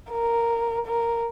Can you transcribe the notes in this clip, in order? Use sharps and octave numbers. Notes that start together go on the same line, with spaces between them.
A#4
A#4